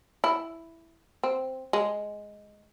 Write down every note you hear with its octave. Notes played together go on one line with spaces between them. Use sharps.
E4
C4
G#3